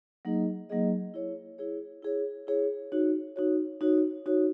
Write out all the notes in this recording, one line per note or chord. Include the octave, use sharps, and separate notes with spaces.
F#3 A#3 D#4 G#4 D#5
F#3 A#3 D#4 G#4 D#5
E4 G#4 C#5
E4 G#4 C#5
E4 G#4 C#5
E4 G#4 C#5
D#4 F#4 C#5
D#4 F#4 C#5
D#4 F#4 C#5
D#4 F#4 C#5